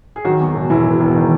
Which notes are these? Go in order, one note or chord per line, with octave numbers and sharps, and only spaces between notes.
G#4
D#3 F#3 F#4
E2
E1
E1 E3 E4
E1
E1
D#3